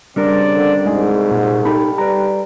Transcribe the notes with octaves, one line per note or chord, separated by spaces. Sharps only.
C#3 G3 C4 D4 A#4 D5
D3
C2 G#2 G#3 G#4
A#2
D#4 G4 A4 B5
G3 B4 A#5